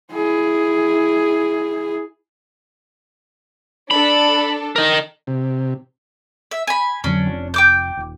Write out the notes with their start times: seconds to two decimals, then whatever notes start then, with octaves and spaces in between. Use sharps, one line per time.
0.12 E4 G#4
3.91 D4 A4 B5
4.76 A#4 D#5
5.27 C3
6.51 E5
6.67 G#5 B5
7.04 F2 D3 F#3 C#4 D4
7.27 F1
7.54 G5 D6 G6
7.97 D#1